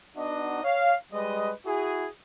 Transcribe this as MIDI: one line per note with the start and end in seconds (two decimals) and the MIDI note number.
0.15 0.61 59
0.15 0.61 62
0.15 0.61 63
0.15 0.61 66
0.15 0.61 75
0.63 0.94 73
0.63 0.94 77
1.12 1.51 55
1.12 1.51 56
1.12 1.51 71
1.12 1.51 75
1.65 2.06 64
1.65 2.06 66
1.65 2.06 68